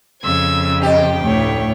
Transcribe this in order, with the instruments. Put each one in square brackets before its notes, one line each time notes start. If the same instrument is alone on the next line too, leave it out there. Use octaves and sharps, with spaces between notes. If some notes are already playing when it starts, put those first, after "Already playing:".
[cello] F2 C#3 [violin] E6 G#6
[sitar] D#4 G4 [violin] G5
[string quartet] D2 A2 C#5